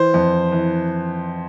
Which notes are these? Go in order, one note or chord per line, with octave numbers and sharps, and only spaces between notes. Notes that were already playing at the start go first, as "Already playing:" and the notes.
Already playing: E3 C5
F2
E3